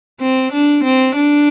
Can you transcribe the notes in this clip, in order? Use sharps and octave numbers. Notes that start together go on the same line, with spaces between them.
C4
D4
C4
D4